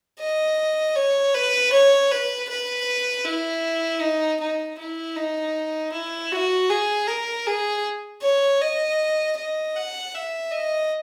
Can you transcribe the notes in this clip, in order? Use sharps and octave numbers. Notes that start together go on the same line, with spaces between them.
D#5
C#5
B4
C#5
B4
B4
E4
D#4
D#4
E4
D#4
E4
F#4
G#4
A#4
G#4
C#5
D#5
D#5
F#5
E5
D#5